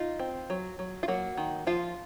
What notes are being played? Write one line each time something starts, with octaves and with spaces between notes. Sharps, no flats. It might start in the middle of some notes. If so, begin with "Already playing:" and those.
Already playing: D#4 F4
C4
F#3
F#3
F4
F#3 A#3 F#4
D#3
F3 F4